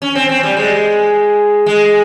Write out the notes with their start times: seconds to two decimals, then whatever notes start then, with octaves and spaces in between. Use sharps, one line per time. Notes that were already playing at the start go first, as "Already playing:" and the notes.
0.02 C#4
0.15 C4
0.29 C4
0.43 G3
0.57 G#3
1.66 G#3